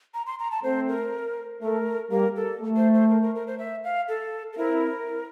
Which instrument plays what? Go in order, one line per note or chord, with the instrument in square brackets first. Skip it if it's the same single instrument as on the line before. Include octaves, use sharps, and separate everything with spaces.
[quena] A#5
C6
A#5
A5
[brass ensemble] A3 C4 [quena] C5
[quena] A#4
[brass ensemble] A3 [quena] A#4
[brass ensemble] G3 A#3 [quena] A#4
[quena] A4
[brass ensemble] A3
[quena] C5
C5
A#4
A#4
A#4
C5
E5
F5
A4
A4
[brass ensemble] C4 E4 [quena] A#4